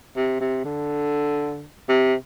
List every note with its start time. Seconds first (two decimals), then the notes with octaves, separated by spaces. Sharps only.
0.16 C3
0.41 C3
0.65 D3
1.89 C3